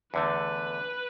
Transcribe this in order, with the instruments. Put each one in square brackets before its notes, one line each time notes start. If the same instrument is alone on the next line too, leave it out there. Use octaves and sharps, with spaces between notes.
[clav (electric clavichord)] E2 D3 A3 [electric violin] B4